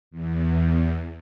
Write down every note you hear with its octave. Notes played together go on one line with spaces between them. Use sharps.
E2